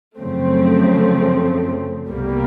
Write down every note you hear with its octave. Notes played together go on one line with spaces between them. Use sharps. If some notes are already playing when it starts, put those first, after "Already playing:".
F#2 C#3 F3 A3 C4
C2 B2 G3 A#3